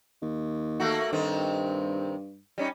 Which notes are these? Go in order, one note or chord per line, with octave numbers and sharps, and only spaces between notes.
D#2
A3 A#3 F#4
G2 C3 D#3 C4
G3 C#4 D#4